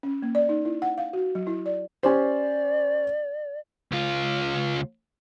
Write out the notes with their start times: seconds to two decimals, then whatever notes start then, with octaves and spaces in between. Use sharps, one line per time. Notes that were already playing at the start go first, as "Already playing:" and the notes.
0.03 C#4
0.22 A#3
0.35 D5
0.49 D#4
0.65 E4
0.82 F#5
0.98 F5
1.13 F#4
1.35 F#3
1.47 E4
1.66 D5
2.03 C#4 G4 C5 D5
3.92 C#2 F4